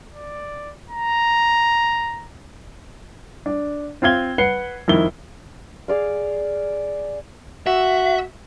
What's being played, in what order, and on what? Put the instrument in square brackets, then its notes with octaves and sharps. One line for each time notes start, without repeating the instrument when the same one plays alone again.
[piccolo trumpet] D5
A#5
[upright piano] D4
C4 F4 F5 G#6 G7
B4 F#5 C7 C#7 G7
F2 D#3 E4 G7
[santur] G#4 D5 F5
[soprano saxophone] F#4 [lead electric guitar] E5